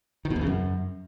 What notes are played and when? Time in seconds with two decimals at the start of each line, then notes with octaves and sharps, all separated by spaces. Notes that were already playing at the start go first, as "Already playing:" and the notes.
0.25 D#3
0.30 B2
0.36 E2
0.41 C#3
0.47 F#2